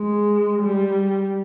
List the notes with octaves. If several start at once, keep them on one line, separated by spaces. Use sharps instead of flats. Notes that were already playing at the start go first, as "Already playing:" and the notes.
Already playing: G#3
G3